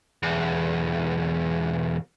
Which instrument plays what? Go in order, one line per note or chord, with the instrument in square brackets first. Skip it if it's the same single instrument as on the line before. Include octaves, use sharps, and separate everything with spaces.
[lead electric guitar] B1 E2